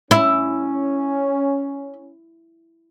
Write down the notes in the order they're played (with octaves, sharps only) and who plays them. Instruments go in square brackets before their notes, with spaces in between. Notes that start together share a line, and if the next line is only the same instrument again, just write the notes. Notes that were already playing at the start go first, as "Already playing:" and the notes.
[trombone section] C#4 [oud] E4